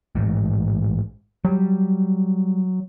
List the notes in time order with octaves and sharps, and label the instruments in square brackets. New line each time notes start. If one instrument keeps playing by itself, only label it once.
[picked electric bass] A1 G#2
[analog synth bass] F#3 [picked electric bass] G3